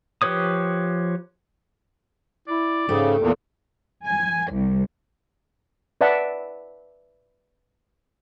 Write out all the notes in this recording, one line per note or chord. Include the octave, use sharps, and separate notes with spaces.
F3 G4 B4 C#5 D#6
E4 D5
G#2 C#3 A3 G4
E2 A#2
G#5
C2
B4 D5 E5 F#5 A5